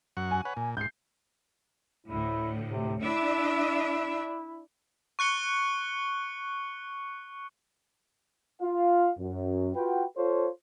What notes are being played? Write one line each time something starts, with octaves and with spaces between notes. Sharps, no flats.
F#2 F#5 C#6
G#5
B4 C#5 F#5
A#2
G#2 G6 C7
D2 A2 E4
C3
D4 E4 E5
C#6 F#6 C#7 G7
F4 F5
F#2
F4 F#4 B4 G5
F4 A4 C5 C#5